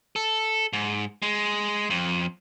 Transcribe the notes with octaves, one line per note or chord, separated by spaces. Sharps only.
A4
G#2
G#3
F2